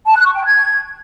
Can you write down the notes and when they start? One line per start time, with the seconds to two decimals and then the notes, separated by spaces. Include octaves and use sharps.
0.06 A5
0.16 F#6
0.25 C#6
0.35 G5
0.45 G#6